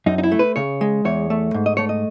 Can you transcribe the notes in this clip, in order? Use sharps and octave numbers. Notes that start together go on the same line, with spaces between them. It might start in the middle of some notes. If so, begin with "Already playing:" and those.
F#2 D#4
D#4
E4
A3
B4
C#3 C#5
G#3
E2 C#5
A3
G#2
D#5
A3 C#5
D#5